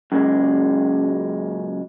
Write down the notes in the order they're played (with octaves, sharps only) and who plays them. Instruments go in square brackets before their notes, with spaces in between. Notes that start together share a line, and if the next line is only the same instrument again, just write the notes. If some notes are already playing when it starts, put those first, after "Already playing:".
[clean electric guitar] F#2 A#2 C#3 G#3